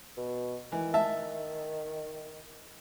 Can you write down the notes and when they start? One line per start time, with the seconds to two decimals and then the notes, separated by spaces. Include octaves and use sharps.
0.17 B2
0.72 D#3 E3
0.94 E5 A5